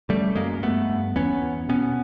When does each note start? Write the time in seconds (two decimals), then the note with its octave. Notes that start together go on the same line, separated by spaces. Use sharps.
0.09 C#3 G3 A3
0.35 F#2 G#3 A#3
0.62 G2 A3 B3
0.89 G2
1.16 E2 B3 C#4
1.42 E2
1.69 B2 B3 C#4